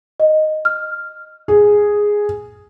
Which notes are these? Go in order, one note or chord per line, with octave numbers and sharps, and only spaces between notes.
D#5
F6
G#4